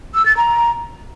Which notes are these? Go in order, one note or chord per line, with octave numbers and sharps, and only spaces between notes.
E6
A6
A#5